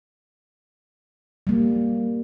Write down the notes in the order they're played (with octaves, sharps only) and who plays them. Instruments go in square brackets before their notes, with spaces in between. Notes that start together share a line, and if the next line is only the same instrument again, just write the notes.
[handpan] G3 A#3